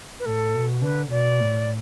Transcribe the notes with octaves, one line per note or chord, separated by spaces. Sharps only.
B4
A2 A4
B2
D3 B4
B2 D5
A2